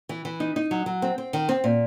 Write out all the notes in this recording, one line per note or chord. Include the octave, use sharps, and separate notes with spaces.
E3
E3
D#4
D#4
F#3
F#3
C4
C4
D#3
C4
A#2